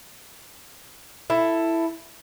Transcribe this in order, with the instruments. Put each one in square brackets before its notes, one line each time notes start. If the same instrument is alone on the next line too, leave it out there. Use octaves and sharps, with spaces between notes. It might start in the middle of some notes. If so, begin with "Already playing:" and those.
[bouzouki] E4 A4